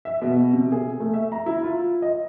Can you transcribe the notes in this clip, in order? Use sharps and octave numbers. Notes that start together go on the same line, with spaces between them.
E5
B2
C3
G#4
A3
E5
A#5
E4
F4
D#5